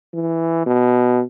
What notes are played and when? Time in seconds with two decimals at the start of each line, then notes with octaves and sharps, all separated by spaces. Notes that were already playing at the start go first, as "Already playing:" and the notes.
0.13 E3
0.66 B2